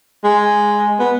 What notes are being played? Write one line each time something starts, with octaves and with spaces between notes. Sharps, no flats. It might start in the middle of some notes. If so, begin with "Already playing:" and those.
G#3
B3